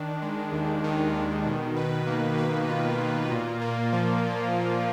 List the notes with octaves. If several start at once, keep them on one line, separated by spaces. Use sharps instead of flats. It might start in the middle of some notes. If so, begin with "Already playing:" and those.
Already playing: D#3 D4
G#3
D#2
D#3
D#3
B2
B4
A#3
B4
F4
A#3
A#2
A#3
F3
A#2
A#2